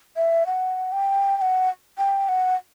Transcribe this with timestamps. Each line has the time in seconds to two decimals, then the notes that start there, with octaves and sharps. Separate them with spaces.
0.16 E5
0.46 F#5
0.92 G5
1.37 G5
1.42 F#5
1.98 G5
2.29 F#5